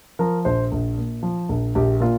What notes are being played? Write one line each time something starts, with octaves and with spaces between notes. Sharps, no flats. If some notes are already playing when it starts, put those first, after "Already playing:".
F3 A#4
A#1 C5
A#1
A#2
F3
A#1
A#1 G4
A#2 F4